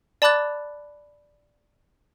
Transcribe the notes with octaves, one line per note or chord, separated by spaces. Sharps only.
D5 A5 B5 D6 F#6 A6